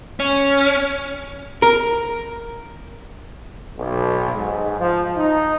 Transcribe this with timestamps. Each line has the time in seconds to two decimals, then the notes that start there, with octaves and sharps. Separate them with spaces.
0.20 C#4
1.62 A#4
3.78 B1
4.34 G#2
4.79 F3
5.17 D#4